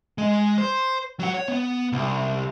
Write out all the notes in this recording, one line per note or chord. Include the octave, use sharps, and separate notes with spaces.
G#3
C5
F#3 F#5
C#5
B3
C2